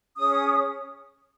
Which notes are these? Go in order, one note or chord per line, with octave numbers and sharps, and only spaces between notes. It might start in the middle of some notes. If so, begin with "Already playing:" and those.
C#4 G#4 C#5 D#6